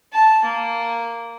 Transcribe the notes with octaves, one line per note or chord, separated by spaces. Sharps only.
A5
A#3